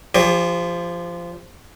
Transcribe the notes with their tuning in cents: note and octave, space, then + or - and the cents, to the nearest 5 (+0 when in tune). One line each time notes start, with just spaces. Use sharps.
F3 -15 G4 +30 D5 -45